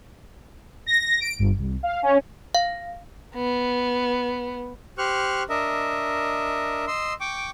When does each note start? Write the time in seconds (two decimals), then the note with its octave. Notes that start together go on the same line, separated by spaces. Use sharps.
0.86 A#6
1.20 D7
1.39 G1
1.58 C2
1.83 F5
2.03 C#4
2.55 F5
3.35 B3
4.98 G4 C5 C#6 F6 F#6
5.49 D4 A#4 D#5 E5
6.87 D#5 C6 E6
7.21 G5 C#6 D6